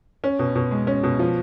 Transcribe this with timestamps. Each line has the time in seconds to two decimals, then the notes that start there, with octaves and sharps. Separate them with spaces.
0.24 C#4
0.39 B2
0.55 B2
0.71 G#3
0.87 C#4
1.03 B2
1.19 F3